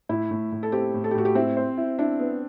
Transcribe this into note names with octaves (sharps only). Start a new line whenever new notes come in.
A2 E4
A2
A2
A4
C4 G4
A2
A4
G4
A2 F#4
G4
C4 E4
C5
E4
D4 E4
B3